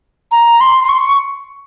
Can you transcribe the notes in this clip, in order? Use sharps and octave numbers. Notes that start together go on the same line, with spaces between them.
A#5
C6
C6
C#6